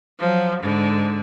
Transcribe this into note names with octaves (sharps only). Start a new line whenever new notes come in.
F3 F#3
G#2 D3